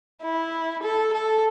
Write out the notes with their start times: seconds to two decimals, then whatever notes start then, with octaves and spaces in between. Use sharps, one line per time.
0.23 E4
0.83 A4
1.13 A4